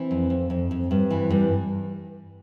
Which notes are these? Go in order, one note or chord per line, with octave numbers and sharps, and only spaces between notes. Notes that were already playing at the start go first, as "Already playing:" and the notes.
Already playing: E3 C4
F2
F2
F2
F2
G2
E3
G2